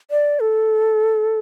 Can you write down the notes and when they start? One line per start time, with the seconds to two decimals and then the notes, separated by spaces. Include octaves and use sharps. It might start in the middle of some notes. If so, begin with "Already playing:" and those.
0.11 D5
0.40 A4